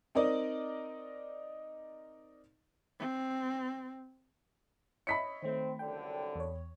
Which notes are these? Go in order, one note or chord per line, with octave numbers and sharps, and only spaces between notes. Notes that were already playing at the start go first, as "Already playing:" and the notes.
C4 D#4 A#4 D5 D#5
C4
C#5 D#5 E5 B5 B6 C#7
D#3 A3 C4
C2 F#2 D3 G5
E2 C#5